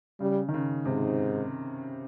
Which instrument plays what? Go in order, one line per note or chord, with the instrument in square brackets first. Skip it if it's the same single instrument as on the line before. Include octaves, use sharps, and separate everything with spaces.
[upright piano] C#3 [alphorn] G3
[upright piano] D#3
C#3
[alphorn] G#2 [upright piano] C3